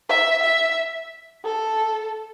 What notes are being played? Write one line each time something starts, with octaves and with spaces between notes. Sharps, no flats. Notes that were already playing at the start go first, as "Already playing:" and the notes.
E5
E5
A4